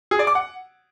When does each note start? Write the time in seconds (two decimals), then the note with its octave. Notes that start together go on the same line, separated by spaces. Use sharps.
0.11 G#4
0.19 D5
0.27 D6
0.35 F#5